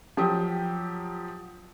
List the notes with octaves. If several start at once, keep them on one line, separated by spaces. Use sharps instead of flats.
F3 F#3 G4 G5 D#6